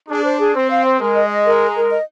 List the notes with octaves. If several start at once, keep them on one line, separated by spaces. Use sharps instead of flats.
D4 G#4
C5
G#4
C4 C5
F5
C5
G#3 A#4
D#5
D#5
A#4
A#5
A#4
D#5